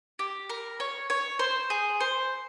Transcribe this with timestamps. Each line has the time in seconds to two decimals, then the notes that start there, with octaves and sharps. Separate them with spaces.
0.19 G4
0.49 A#4
0.80 C#5
1.10 C#5
1.39 C5
1.70 G#4
2.00 C5